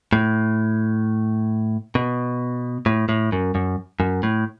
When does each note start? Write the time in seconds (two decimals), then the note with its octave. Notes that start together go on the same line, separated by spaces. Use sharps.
0.13 A2
1.95 B2
2.86 A2
3.09 A2
3.32 F#2
3.55 F#2
4.00 F#2
4.23 A2